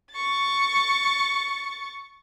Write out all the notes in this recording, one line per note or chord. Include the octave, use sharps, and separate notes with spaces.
C#6 A6